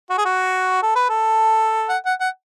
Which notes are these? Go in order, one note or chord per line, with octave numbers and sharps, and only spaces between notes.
F#4
G#4
F#4
A4
B4
A4
F#5
F#5
F#5